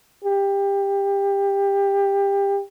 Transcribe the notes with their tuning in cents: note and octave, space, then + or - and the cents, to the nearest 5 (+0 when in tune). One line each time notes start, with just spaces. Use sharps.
G4 +20